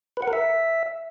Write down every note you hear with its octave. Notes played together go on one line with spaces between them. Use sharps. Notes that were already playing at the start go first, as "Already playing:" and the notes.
B4
F#5
A#4
E5